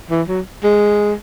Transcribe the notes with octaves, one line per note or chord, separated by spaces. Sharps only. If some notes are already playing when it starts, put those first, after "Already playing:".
E3
F#3
G#3